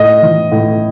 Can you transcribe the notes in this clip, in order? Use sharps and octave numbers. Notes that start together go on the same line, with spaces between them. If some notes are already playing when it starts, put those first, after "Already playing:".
Already playing: A2 D#5
E3
A2